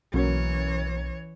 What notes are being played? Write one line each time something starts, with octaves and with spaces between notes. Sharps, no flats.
B1 E3 F#3 A#3 C#4 C#5